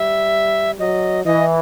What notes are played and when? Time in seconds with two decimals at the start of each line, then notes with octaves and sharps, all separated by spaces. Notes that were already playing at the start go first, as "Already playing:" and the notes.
Already playing: G3 E5
0.80 F#3 D#5
1.25 E3 D#5